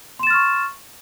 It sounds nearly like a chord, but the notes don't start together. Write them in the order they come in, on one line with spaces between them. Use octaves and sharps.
C6 E7 A6 F6 C#6